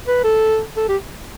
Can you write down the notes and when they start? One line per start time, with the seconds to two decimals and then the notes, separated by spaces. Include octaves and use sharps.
0.07 B4
0.24 A4
0.76 A4
0.88 G4